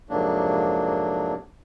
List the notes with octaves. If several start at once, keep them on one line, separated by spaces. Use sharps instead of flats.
F2 G#2 C3 F#3 A#3 D4